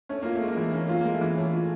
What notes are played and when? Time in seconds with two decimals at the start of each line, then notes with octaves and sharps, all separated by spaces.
0.09 A3 C#4
0.22 A#3 F4
0.35 A3
0.41 G#3
0.48 A#3
0.57 E3 A3
0.74 A#3 C#4
0.87 A3 F4
1.01 G#3 A#3
1.14 A3
1.21 E3
1.37 A3 C#4
1.53 F4